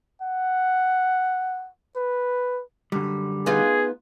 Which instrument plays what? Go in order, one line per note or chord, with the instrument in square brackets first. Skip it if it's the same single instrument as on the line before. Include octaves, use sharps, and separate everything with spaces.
[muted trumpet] F#5
B4
[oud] F#2 [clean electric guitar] D3 G3
[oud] B3 D#4 F4 [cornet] G#4